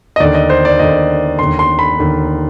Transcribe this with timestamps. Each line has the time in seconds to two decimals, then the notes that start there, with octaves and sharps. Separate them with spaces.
0.16 D#5
0.20 D#2 D3 D5
0.34 D#5
0.50 C5
0.65 D5
0.79 D#2 D3 D#5
1.39 D#2 D3 C6
1.59 C6
1.79 B5
1.98 D#2 D3